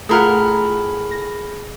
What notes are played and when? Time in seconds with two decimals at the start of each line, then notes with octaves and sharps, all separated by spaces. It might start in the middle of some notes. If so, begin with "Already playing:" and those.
0.09 A2 A3 F4 G#4 A#4 F#5 B5 F6
1.11 A#6